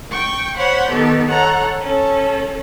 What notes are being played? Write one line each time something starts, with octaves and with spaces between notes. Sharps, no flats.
G5 C#6
C5 C#5 F#5 B5 G6
D#3 B3 G4 A4
A4 C#5 F#5 A#5
C#4 A4